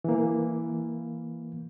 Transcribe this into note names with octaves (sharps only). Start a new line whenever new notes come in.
E3 A#3